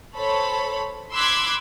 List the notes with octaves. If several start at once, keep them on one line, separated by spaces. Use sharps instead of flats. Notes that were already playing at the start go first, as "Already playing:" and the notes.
A4 C5 C#5 B5
B5 C6 D6 E6 F#6 G#6